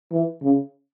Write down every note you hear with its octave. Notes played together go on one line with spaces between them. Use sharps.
E3
C#3